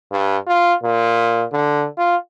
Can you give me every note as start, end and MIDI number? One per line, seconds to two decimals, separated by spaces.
0.12 0.37 43
0.47 0.73 65
0.83 1.44 46
1.52 1.87 50
1.98 2.16 65